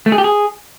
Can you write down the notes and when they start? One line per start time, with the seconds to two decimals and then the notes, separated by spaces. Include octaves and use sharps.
0.06 A3
0.12 G#4
0.18 G4
0.24 G#4